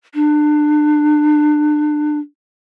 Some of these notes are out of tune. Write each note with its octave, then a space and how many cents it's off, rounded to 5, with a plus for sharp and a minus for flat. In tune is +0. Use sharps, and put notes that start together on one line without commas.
D4 +30